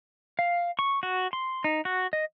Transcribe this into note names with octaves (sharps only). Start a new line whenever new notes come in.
F5
C#6
F#4
C6
D#4
F#4
D#5